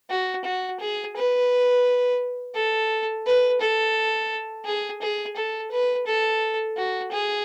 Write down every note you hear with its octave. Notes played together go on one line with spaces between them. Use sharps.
F#4
F#4
G#4
B4
A4
B4
A4
G#4
G#4
A4
B4
A4
F#4
G#4